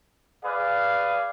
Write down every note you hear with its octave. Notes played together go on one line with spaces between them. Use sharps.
G#4 B4 D5 F5